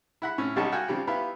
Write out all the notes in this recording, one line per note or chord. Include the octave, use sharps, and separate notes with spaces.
E4 F#5 B5
A2 C#4
B1 C#3 G3 D#4 C#5 A5
F#4 F5 G5 G#5
C#3 F3 G3 G4
B3 E4 F4 G4 B4